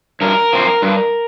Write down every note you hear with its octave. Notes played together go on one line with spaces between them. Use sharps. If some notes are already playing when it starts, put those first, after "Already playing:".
G2 A#4
F3 C4
G2